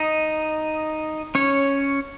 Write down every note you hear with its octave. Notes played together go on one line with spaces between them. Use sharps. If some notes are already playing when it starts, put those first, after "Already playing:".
Already playing: D#4 D#5
C#4 C#5